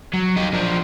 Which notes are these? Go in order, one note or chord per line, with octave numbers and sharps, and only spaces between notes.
F#3
D#4 G4
F3 D4